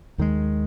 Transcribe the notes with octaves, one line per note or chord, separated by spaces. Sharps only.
D#2 D#3 G#3